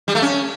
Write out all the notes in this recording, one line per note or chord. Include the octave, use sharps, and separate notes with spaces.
G3
A3
C#4